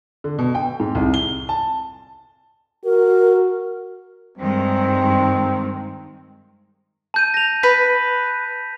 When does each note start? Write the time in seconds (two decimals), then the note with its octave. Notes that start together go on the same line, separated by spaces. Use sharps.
0.24 D3
0.39 B2
0.55 G5
0.80 G#2
0.95 C2
1.14 G7
1.49 A5
2.85 F#4 A#4
4.37 G2 D#3 G#3 C4
7.14 A5 G6 D#7
7.34 A#6 F7
7.63 B4 B6